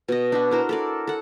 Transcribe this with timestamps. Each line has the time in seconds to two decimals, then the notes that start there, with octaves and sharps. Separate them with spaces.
0.08 B2 D#5
0.32 D4 F#4 B4
0.51 E4 A#4 C5
0.69 A4 A#4 D5
1.07 A4 F#5